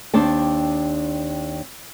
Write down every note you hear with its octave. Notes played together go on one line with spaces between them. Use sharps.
D#2 C4 D4 A5